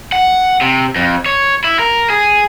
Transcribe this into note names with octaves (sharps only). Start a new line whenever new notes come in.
F#5
C3
F2
C#5
E4
A#4
G#4